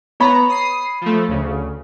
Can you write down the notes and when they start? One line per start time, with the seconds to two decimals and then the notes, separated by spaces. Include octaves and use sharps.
0.20 B3 C#5 A#5 B5
0.50 D#6 C7
1.01 F3 A3
1.28 D2 C#3